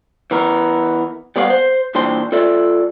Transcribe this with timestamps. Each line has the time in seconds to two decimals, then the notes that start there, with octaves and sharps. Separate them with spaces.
0.31 E3 B3 A#4
1.36 G3 B3 G4 D5 F5 F#5
1.50 C5
1.95 A#2 E3 D4 C5 G5 C6
2.32 F4 A4 D5 E5